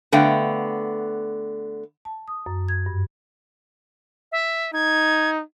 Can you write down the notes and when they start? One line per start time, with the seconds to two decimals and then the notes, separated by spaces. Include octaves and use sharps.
0.12 D3 A3 B3 F5 G5
2.05 A5
2.28 D#6
2.46 F#2
2.69 G#6
2.86 G2
4.32 E5
4.73 D#4 G#6